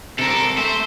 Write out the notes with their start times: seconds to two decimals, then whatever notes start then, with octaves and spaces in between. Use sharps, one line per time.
0.19 C3 A4 A#4
0.58 A3 C5 E5